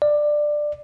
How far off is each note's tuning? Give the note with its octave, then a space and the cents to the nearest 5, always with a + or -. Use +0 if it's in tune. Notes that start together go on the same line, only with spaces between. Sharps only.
D5 +15